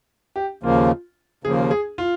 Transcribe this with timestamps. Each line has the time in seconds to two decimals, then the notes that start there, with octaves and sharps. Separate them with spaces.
0.36 G4
0.63 D#2 C#3 F3 A#3 F4
1.44 D#2 C#3 F3 A#3 G#4
1.71 G#4
1.98 F4